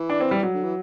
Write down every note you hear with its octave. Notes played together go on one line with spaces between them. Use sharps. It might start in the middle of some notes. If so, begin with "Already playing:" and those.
Already playing: E3
D4
C4
G3
F#3
D3
E3